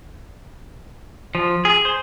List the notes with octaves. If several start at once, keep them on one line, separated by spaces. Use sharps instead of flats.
F3
G#4
C5